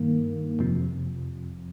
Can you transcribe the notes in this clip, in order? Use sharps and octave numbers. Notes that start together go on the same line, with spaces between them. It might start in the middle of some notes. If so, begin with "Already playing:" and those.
Already playing: G2 D#3 A#3
F2 C3 F3